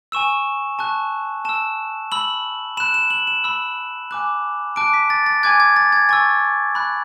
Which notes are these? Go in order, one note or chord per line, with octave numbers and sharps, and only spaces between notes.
G#5 C#6 E6 E7
A5 C#6 F#6
A5 E6 E7
B5 E6 F#7
B5 F#6 E7
E7
F#7
E7
B5 E6
G#5 D6 F#6
A5 D6 F#6 D7
B6
A6
A6
G#5 D6 F#6 G#6
G#6
A6
G#6
G#5 C#6 E6 A6
B5 F#6